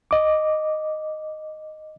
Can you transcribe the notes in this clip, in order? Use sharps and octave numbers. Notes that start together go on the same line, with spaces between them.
D#5 D6